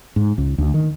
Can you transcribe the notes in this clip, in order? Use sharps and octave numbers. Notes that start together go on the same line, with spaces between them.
G#2
C#2
D2
D#3